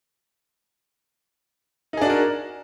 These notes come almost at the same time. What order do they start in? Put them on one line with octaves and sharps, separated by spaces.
D#4 G#4 D4 F#4 A#4